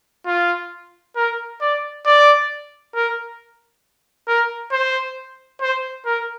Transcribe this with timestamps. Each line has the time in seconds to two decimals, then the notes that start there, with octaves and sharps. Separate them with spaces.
0.26 F4
1.16 A#4
1.61 D5
2.06 D5
2.94 A#4
4.28 A#4
4.72 C5
5.62 C5
6.05 A#4